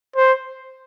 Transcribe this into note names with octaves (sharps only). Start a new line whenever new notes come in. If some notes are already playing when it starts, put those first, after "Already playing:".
C5